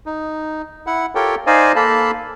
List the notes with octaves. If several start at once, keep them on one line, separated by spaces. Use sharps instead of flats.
D#4
E4 F#5
F4 G4 A4 A#4 C#5 G5
D#4 C5 D5 D#5 F5 G#5
A#3 A4 F5 A5 B5